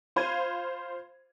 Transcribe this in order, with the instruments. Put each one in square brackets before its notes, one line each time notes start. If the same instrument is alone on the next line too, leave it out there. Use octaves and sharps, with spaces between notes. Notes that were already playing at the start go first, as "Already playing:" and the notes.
[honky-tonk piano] F4 C5 F5 B5 G#6 D#7